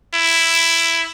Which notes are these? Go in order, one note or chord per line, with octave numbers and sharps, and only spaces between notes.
E4